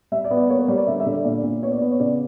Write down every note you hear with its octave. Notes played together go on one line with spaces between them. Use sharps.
G3 E5
D5
B3
D5
A#3 C#5
B4
G3 C#5
D5
D3 E5
E5
D3
D5
A#2 D5
A#2
B3 C#5
D5
B3
C#5
C#3 D5